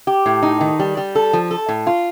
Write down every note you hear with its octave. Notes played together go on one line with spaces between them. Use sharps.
G4
A2
D#4
D#3
G3
G3
A4
F3
A4
A2
F4